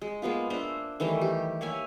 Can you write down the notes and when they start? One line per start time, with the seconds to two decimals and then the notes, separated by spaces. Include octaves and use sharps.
0.02 G#3
0.22 G#3 A#3 B3 F4
0.50 A#3 D4 C5 E5
1.00 D#3 E3 G3 A3
1.21 G4
1.61 A#3 C#5 E5 G#5